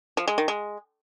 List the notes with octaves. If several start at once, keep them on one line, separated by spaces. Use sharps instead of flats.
F3
G#3
D#3
G#3